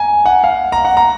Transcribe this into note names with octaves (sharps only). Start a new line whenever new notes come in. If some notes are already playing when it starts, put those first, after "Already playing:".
Already playing: G#5 A#5
F#5
F5
A#5
F#5
A#5